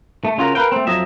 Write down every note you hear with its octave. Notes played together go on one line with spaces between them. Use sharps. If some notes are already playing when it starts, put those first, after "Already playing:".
A3
C#3 C#4 F4 F#4 G#4 A#4
A#4 B4 F5 G5
A3 C4
F2 F#3 D#5 E5